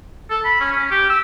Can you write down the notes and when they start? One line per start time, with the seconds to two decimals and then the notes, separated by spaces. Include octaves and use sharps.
0.30 A4
0.45 B5
0.60 C#4
0.72 C#4
0.91 G4
1.10 E6